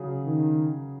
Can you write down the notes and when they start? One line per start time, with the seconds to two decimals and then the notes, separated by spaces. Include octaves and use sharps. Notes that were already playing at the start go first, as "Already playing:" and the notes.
Already playing: C#3 F#3 C#4 G#4
0.24 D#3